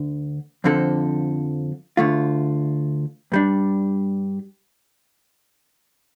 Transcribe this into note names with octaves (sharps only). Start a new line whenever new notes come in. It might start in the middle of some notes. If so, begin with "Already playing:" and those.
Already playing: D2 D3
F2 D3 F3 C4 A4
D2 D3 A3 F4
G2 G3 D4